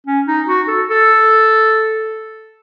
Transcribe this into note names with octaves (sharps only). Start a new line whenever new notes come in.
C#4
D#4
F#4
A4
A4